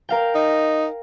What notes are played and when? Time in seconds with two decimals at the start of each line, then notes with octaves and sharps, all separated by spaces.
0.09 A#4 F5 G5
0.35 D#4